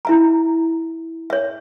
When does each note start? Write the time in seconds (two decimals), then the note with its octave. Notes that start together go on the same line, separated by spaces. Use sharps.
0.05 E4 E5 A#5
1.30 C#5 E5